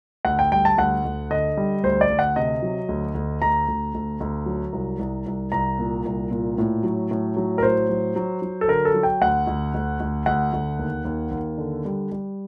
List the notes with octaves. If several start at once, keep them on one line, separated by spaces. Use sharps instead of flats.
D2 F#5
G5
G3 G5
A5
D2 F#5
D2
D3 D#5
G3
D2 C5
D5
D2
F#5
C3 D#5
F#3
D2
D2
D2 A#5
D2
D2
D2
F#3
C2
C2
C2
C2 A#5
A#2
C2
A#2
A2
F#3
A2
F#3
A#4
A2 C5
F#3
F#3
F#3
A4
D3 A#4
A4
F#3
G5
D2 F#5
D2
D2
D2
D2 F#5
D2
D#2
D#2
D#2
D3
G3
G3